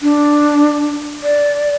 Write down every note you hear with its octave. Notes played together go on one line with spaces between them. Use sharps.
D4
D5